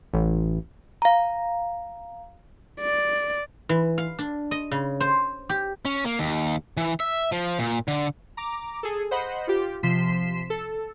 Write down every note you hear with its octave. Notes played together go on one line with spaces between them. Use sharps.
A1
F5 A#5
D5
E3
F5
D4
D#5
C#3
C5
G4
C#4
A#3
D#2
E3
E5
F3
A#2
D3
A#5 D6
G#4 A4
C5 D#5 F#5 B5
F4 G4
C3 F3 C6 B6 C7 E7
A4